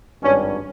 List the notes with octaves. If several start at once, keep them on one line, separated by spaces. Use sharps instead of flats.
G#1 G2 G3 C#4